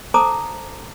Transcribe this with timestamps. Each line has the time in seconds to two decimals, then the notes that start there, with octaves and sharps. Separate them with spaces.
0.14 A4 C5 A5 A#5 D6 D#6